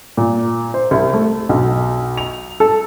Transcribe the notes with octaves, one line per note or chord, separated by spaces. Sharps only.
A#2
C5
C2
A3
B1
F7
A4